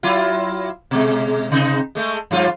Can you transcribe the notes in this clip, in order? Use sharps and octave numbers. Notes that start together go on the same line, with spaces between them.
F#3 E4 F4
B2 G#3
G#2 C3 D#4
G#3 A3
G2 F3 F4